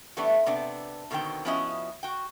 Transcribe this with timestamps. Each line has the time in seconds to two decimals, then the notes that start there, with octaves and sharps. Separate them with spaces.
0.17 E3 G3 A3 B3 D4 E4
0.46 C3 B3 D4 D5
1.11 B2 D3 D#3 C4 G5
1.45 F3 B3 C#4 E4 F#4 D#5
2.03 F#4 G5